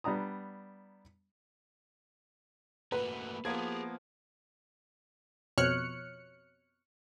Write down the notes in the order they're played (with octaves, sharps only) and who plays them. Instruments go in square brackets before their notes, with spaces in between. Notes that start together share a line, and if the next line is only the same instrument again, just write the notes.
[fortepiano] G3 B3 D4 A#5 D#6
[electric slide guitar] A3 A#3 F#4 [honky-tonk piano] B4
[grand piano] F3 A#3 B3 [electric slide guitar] G4 G#4 [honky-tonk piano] G#6
[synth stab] F2 B2 C#5 F6 F#6 C#7